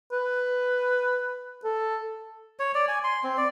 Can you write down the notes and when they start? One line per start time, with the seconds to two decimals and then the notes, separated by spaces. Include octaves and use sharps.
0.12 B4
1.64 A4
2.59 C#5
2.75 D5
2.88 G#5
3.04 C6
3.24 C4
3.38 D5